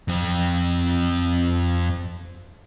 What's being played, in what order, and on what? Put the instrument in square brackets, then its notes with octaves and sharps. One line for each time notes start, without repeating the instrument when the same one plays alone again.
[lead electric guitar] F2 C4